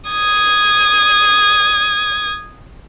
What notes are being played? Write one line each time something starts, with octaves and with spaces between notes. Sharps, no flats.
D#6 G#6